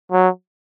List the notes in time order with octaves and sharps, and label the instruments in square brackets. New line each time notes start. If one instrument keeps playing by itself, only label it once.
[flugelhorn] F#3